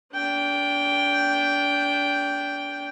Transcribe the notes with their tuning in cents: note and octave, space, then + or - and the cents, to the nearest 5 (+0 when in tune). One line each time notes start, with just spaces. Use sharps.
D4 -35 G5 +0